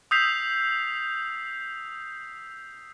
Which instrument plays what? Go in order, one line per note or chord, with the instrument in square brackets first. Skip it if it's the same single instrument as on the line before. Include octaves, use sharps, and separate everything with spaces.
[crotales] D#6 E6 G6 B6 C7 F7